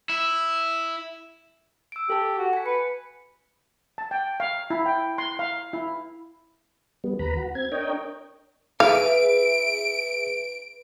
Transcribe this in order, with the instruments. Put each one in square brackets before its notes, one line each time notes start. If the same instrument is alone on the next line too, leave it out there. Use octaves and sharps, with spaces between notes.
[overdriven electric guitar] E4
[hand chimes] E6 D7
[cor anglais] G4 [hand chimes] A4 A5
[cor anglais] F#4
[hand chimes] G#5 B6
[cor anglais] B4 [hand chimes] C#7
[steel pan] A5
G5
F5
E4
G5
C6
F5
E4
[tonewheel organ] G3 B3
D#2 B4 A#5 B5
F#4
C4 G#6
D4 A#4 C#5 D#5 G5
[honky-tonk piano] E4 G#4 E5 [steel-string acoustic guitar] B4 [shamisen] F5 [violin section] D7